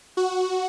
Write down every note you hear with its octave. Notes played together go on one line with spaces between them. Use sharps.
F#4